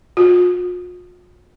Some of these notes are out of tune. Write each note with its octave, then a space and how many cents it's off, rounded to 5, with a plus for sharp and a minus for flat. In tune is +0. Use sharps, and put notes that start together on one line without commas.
F4 +45